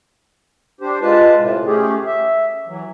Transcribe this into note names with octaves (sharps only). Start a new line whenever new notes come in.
D4 G4 C5
G#3 F4 B4 A5
A2 C3
A3 C#4 G4 G#4
E5
E3 F#3